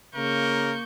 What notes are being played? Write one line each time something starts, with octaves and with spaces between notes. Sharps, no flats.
C#3 A#3 A#4 C#6 G6